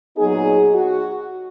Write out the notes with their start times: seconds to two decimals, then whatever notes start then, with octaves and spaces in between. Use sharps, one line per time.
0.16 A#2 F#3 B3 D#4 G#4
0.74 F#4